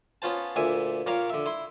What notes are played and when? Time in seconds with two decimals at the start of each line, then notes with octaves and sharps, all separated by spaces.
0.22 B3 C#4 F4 C5 A5
0.56 D2 A#2 E5 G#5
1.06 A#2 A#4 C#5 F5
1.30 D3 E5
1.46 E4 C6